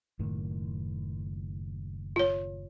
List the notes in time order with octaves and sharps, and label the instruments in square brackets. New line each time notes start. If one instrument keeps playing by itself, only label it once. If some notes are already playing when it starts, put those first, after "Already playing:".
[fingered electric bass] F#1 A2 D#3
[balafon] F4 C#5